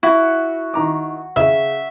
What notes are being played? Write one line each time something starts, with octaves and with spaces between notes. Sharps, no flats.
E4 F#4
D#3 A#5 D6
C#3 E5